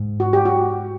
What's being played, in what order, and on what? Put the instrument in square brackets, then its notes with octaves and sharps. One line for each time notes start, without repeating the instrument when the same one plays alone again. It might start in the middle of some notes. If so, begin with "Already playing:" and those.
Already playing: [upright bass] G#2
[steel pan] F#4
G4
F#4